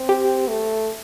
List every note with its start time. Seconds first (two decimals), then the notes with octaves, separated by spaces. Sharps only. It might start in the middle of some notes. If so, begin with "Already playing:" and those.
Already playing: C4
0.09 G4
0.48 A3